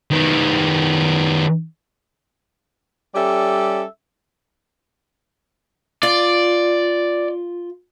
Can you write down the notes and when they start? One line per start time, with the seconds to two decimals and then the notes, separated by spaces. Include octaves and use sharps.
0.11 D#3 B3
3.15 G3 C#4 G4 A4 D5 E5
6.03 F4 D5